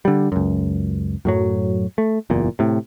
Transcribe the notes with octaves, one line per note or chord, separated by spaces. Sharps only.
D3 G3
C#2 F#2
F#2 A2 F#3
A3
F#1 E2 A#2
A2 C3